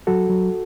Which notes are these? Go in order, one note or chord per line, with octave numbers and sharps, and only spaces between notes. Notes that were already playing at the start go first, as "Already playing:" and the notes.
F#3 F#4 A4
F#3